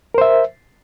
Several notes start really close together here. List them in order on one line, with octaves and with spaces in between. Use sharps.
A#4 C5 E5